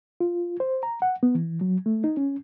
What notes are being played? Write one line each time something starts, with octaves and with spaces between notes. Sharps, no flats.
F4
C5
A#5
F#5
B3
E3
F#3
A3
D#4
C#4